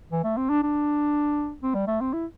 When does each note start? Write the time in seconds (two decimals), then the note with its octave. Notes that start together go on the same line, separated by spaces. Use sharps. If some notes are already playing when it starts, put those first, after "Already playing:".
0.12 E3
0.24 A3
0.37 C4
0.49 D4
0.63 D4
1.63 C4
1.75 G3
1.87 A3
2.01 C4
2.13 E4